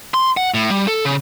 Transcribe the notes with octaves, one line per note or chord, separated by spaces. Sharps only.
C6
F#5
A2
G3
A4
C#3